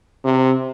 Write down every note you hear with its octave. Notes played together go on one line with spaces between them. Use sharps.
C3